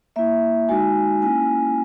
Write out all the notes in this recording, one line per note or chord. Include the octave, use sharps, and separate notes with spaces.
A#3 E4 E5
G#3 D#4 F#4 G#5
A#3 C#4 E4 G#5